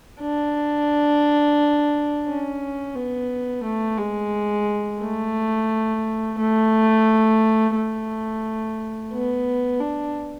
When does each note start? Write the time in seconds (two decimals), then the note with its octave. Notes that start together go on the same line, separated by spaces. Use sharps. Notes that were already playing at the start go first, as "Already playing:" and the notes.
0.21 D4
2.27 C#4
2.95 B3
3.63 A3
3.98 G#3
5.01 A3
6.38 A3
7.75 A3
9.13 B3
9.80 D4